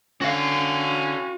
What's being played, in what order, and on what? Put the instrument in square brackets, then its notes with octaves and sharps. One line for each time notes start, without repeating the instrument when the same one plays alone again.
[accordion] D3 [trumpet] C#4 [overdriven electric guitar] F#4 F5